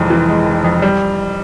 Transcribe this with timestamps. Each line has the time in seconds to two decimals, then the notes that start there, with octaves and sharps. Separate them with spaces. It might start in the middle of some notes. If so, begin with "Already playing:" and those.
Already playing: F1 F2 E3 G#3
0.10 E3
0.29 G#3
0.46 F1
0.64 F2
0.82 G3